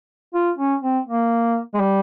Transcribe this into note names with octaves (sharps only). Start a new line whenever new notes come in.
F4
C#4
C4
A#3
G#3
G3